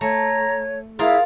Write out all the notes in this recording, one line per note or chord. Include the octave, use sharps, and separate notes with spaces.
A3 C#5 A#5
E4 F4 G#4 A#4 F5